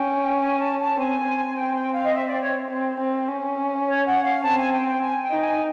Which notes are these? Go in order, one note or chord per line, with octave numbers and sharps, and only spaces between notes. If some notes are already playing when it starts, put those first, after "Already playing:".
Already playing: C#4 G5
G#5
A5
A5
C4 G#5
C4
G5
G5
F5
D#5
E5
D5
C#5
C4
C4
C#4
C#5
F#5
F5
C4 A5
G#5
G5
G5
G#5
G5
D#4
G#5